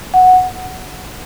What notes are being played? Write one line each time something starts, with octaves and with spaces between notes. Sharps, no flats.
F#5